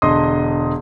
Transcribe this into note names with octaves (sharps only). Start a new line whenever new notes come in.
E1 D3 D#5 C6 D#6